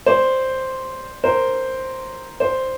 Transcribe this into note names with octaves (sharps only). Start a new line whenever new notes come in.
C5 D5
A#4 C5
C5 D5